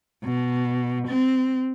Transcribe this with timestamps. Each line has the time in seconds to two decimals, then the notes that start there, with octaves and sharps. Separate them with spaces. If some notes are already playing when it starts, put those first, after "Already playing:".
0.24 B2
1.08 C4